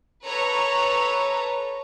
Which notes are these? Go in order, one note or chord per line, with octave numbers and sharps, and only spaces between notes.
A4 B4 C#5 A#5